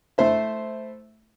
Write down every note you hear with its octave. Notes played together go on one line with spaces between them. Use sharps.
A3 E4 C5 E5